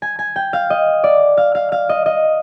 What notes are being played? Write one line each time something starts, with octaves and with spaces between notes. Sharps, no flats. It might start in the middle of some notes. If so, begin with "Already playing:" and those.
G#5
G#5
G5
F5
D#5
D5
F5
F5
F5
D#5
D#5